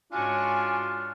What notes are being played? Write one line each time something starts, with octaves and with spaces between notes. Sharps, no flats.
G#2 C#4 D4 F4 F#4 G#5